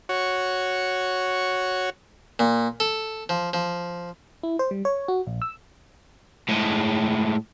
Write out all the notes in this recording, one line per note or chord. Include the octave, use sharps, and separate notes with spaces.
F#4 C#5
A#2
A4
F3
F3
E4
C5
G3
C#5
F#4
A#1
E6
A2 G#3